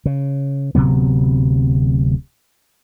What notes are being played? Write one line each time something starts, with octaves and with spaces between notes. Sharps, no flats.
C#3
D1 C3 F#3 B3